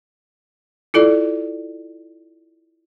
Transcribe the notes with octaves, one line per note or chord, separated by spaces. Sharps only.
E4 F4 A4 D5